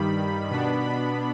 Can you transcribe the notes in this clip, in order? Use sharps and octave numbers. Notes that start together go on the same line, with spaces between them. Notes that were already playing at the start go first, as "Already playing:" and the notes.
Already playing: G2 D#3 G3 B5
B2 B3 D4 B5
B5